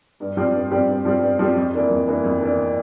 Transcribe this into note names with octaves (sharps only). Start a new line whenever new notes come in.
G2
F3 C4 G4 D5
G2
F3 C4 G4 D5
G2
F3 C4 G4 D5
G2
F3 C4 G4 D5
F2
E3 A#3 D4
F2
E3 A#3 D4
F2
E3 A#3 D4